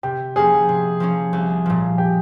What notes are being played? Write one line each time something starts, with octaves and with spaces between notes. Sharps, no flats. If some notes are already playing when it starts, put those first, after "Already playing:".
C3 G4
F3 A#3 C#4 G#4
C3
F3 A#3 C#4
C2
A#2 F3
G4